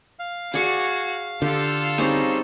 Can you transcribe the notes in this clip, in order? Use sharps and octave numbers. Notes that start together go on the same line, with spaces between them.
F5
F#4 G#4 D5 C#6
D3 F4 G4 A4
G3 C4 C#4 D#4 G#4